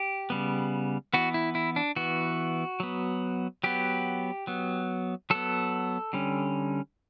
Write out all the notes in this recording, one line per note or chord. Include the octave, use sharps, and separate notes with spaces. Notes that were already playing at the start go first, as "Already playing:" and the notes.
Already playing: G4
C#3 G3 B3
E3 B3 F#4
E4
E4
D4
E3 B3 F#4
F#3 B3
F#3 B3 G4
F#3 B3
F#3 B3 A4
D3 G3 C#4